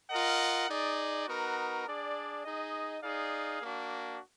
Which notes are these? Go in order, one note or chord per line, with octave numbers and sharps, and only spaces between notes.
F4 A#4 D#5 F#5
D#4 G#4 D5
B3 D#4 F#4 A#4
D4 G#4 D5
D#4 G#4 D#5
D#4 G#4 D5 F5
A#3 D4 F#4